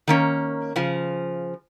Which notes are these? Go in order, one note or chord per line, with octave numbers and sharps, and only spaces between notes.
D#3 A#3 C#4
C#3 F3